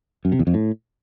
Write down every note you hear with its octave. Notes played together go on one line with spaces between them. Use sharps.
F#2
C3
E2
F2
A2